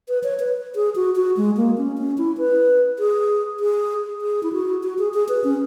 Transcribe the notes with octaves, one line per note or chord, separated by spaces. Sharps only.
B4
C#5
B4
G#4
F#4
F#4
G#3
A#3
C#4
C#4
E4
B4
G#4
G#4
G#4
E4
F#4
F#4
G#4
G#4
B4
C#4